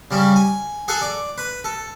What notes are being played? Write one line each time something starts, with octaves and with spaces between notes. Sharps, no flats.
C#3 G3 C#4
G#5
G#4 A4 F#5 G#5
D5
B4
A4